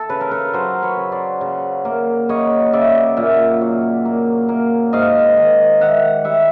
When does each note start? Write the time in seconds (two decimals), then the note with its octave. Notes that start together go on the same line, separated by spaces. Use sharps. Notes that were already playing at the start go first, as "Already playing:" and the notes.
Already playing: A4
0.09 C#3 B4
0.21 A#4
0.31 A4 B4
0.53 F#3 A#4 C5
0.83 B4 C#5
0.97 C#3
1.12 C5 D5
1.41 C#3
1.85 A#3
2.29 C#3 C#5 D#5
2.73 C#3 D5 E5
3.17 A#2 E5 F#5
3.61 F#3
4.05 A#3
4.49 A#3
4.93 G#2 D#5 F5
5.37 D#3
5.81 D#3 E5 F#5
6.24 G3 E5 F#5